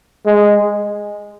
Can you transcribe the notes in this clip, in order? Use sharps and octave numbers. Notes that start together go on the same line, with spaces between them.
G#3